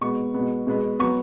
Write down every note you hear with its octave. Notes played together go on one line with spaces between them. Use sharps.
B2 G#3 B3 C#6
B2 G#3 B3
B2 G#3 B3
F#3 B3 C#6